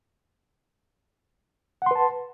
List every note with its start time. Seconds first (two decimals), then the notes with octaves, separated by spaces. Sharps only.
1.82 F#5
1.86 C6
1.91 B4
1.95 A5